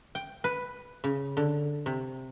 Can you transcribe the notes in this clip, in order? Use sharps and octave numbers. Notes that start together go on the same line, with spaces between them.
G5
B4
C#3
D3
C3